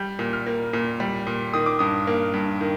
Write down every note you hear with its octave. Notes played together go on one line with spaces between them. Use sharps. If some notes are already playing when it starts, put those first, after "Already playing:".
Already playing: G3 G6
A#2
F6
A#3
A#2
G3
A#2
D#3 D#6
D6
G2 D#6
A#3
G2
D#3